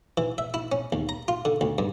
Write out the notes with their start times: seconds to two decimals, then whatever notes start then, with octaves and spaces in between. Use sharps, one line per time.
0.17 E3
0.38 E5
0.54 E4
0.72 C#4
0.92 D#2
1.09 A#5
1.28 F4
1.45 D3
1.61 D2
1.78 G2